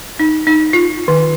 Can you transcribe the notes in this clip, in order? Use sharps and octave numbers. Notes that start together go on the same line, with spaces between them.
D#4
D#4
F4
D#3